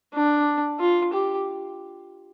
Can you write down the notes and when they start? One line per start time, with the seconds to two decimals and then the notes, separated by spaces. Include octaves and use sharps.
0.14 D4
0.80 F4
1.13 G4